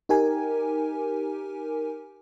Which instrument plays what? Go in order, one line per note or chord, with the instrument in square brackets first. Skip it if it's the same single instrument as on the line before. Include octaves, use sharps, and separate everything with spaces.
[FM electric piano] D#4 G4 A#4 G#5